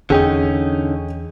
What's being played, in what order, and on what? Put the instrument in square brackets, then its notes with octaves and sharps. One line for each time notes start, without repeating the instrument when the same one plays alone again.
[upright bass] E2 [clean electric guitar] D3 C#4 D#4 [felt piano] G#4 G5